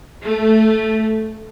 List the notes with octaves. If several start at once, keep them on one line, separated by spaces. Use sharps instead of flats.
A3